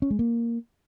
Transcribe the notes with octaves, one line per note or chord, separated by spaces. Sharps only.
C#4
G#3
A#3